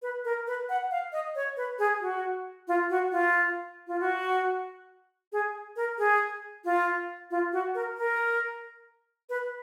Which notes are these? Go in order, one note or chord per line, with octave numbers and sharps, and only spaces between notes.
B4
A#4
B4
F#5
F5
D#5
C#5
B4
G#4
F#4
F4
F#4
F4
F4
F#4
G#4
A#4
G#4
F4
F4
F#4
A#4
A#4
B4